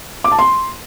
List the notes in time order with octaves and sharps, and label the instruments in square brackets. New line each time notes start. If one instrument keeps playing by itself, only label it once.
[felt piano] D6
A5
C6